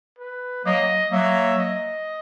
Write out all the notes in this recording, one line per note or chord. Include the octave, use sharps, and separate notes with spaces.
B4
F#3 A#3 D#5
F#3 A#3 E5
D#5